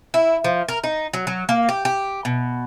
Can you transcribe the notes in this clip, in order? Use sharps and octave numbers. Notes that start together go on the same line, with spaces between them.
E4
F3
A#4
D#4
F#3
F#3
A#3
G4
G4
B2